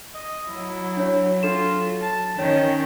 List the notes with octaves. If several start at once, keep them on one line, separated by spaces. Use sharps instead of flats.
D#5
F#3 E4
D4 C#5
D4 F4 A4 E7
A5
D#3 C#4 C#5 G5